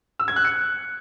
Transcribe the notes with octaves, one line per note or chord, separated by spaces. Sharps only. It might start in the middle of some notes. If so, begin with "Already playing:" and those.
E6
G#6
F#6
C#7